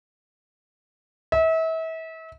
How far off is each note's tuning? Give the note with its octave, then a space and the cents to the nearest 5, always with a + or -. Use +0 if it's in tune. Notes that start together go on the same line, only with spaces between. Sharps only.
E5 -35